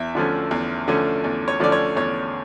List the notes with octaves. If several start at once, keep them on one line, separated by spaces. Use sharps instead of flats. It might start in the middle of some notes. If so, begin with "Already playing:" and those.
Already playing: E2 E5
D3 F3 A3 C#4
E2
D3 F3 A3 C#4
E2
C#5
D3 F3 A3 C#4 D5
C#5
E2 C#5